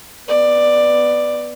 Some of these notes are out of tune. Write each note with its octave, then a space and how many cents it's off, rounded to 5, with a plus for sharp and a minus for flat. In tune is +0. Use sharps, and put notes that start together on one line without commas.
B3 +0 D5 +10